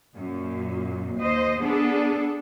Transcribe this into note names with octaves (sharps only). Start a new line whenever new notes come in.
F#2 A#2
D#2 C5 D#5
B3 D4 G#4 A4